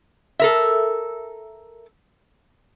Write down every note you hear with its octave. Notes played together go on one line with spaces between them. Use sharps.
A4 A#4 E5